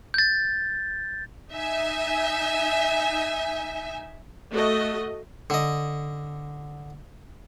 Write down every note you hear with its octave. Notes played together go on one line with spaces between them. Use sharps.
G6 A6
D#4 E5 G#5
A3 F#4 D#5
D3 D#5